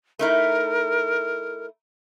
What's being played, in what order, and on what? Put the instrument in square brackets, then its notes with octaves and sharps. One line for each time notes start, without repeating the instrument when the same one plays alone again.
[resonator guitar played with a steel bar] A3 D#4 E4 [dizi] A#4